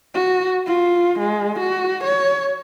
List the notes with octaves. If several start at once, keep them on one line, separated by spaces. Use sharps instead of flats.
F#4
F4
G#3
F#4
C#5